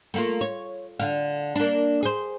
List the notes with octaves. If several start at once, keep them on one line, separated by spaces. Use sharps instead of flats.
A3 A#3 F4
C#5
D3 F5
A#3 D4
G#4 C5